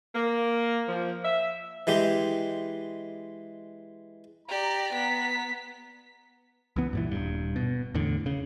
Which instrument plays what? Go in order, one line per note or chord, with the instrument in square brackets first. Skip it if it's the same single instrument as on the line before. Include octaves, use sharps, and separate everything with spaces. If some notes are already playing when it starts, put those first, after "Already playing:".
[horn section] A#3
F3
E5
[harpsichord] E3 G#3 G4
[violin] G4 D5 [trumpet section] A#5
[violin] B3 B6
[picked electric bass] C#2 E3 B3
G2 A#2 E3
D#1 G2
B2
E2 A2 D3
C#3